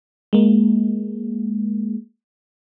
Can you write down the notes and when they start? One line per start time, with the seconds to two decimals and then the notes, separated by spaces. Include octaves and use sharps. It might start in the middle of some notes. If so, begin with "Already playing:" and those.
0.33 G#3 A#3